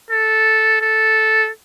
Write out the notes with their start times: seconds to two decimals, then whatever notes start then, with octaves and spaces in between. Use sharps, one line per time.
0.11 A4
0.81 A4